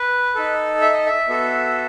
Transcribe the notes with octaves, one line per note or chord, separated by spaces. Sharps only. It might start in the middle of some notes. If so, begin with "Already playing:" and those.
Already playing: B4
D#4 A4
E5
D#5
E5
B3 F#4 A4